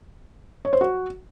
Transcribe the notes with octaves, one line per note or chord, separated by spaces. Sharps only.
C#5
C5
F#4